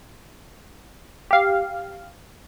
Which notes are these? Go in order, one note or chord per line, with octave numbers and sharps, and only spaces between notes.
G4 F5